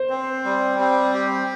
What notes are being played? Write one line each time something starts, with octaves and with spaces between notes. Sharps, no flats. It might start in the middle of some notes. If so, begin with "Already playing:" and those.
Already playing: C5
C4
G3
C4
G4